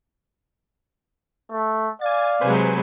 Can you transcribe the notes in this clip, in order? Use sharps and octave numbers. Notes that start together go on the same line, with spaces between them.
A3
D5 F5 G#5 A6
C3 F#3 G#3 B4 C5 G#5